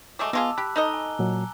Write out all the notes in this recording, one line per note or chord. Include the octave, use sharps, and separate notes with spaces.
F#3 G#3 A3 D6
G#3 B3 F4 G#4 A5 E6
G4 B5 F#6
D#4 A4 D#5 A#5 G7
G#5
A#2 F#3